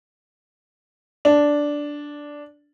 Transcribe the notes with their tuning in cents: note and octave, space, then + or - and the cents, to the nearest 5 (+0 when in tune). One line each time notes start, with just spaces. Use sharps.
D4 -5